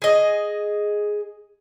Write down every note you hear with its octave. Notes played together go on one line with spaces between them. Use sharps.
G#4 D#5